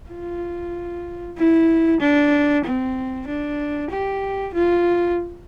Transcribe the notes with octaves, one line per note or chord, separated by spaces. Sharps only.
F4
E4
D4
C4
D4
G4
F4